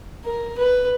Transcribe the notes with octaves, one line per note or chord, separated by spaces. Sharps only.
A#4
B4